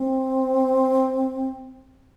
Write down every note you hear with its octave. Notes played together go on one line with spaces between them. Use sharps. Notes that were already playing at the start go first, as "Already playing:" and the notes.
Already playing: C4